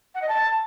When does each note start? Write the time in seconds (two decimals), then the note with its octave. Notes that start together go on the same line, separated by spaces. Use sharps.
0.15 F#5
0.22 D#5
0.29 A5